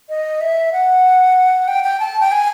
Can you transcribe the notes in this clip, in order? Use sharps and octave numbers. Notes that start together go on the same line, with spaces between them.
D#5
E5
F#5
G5
G5
A5
G5
G#5